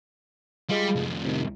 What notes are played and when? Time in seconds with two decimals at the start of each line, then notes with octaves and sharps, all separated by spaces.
0.70 G3 G#3 F4
0.96 C2 F2
1.25 C3 D#3